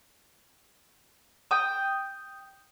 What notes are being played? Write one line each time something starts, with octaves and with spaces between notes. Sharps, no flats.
G5 D#6